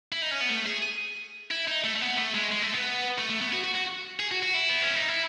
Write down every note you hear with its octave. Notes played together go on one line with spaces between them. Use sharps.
E4
D#4
C#4
B3
A3
G#4
E4
D#4
A3
A3
B3
A3
G#3
G#3
A3
B3
A3
A3
B3
F#4
F#4
F#4
G#4
F#4
F#4
E4
B3
C#4
D#4
E4